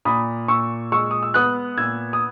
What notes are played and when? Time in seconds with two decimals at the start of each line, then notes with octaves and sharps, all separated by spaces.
0.05 A#2 B5 D#6
0.48 A#2 C#6 E6
0.92 G#3 C#6 E6
1.11 D#6
1.23 E6
1.34 B3 D#6 F#6
1.77 A#2 E6 G#6
2.13 D#6